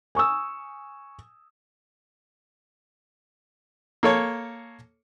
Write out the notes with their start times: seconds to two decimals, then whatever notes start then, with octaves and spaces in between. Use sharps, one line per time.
0.15 G#5 C#6 D#6 E6
4.03 A#3 A4 C#5